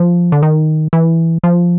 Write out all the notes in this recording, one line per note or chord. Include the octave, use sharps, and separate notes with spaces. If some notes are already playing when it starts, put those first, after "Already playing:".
Already playing: F3
D3
D#3
E3
F3